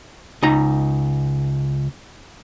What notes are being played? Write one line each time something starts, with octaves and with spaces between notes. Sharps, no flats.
C#2 D#4 A#5